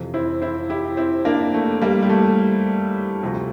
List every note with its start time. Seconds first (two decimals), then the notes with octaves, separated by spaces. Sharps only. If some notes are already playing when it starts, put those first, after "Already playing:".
Already playing: F2 C3 E3
0.14 C4 E4
0.42 C4 E4
0.70 E4 G4
0.97 C4 E4
1.25 A#3 D4
1.54 A3
1.82 G3 A#3
2.02 G3
2.10 A3
3.22 D2 C3 F3